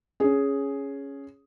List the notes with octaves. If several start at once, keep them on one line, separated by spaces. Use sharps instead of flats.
C#4 G#4